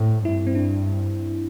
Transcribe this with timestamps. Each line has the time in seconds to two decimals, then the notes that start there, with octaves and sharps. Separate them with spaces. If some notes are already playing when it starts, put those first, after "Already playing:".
Already playing: A2 C4
0.25 G2 E4
0.47 C4
0.55 D4